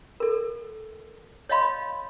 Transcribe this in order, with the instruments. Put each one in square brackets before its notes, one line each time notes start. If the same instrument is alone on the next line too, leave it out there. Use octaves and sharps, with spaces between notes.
[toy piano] A4 A#4
C#5 D#5 F5 B5 C6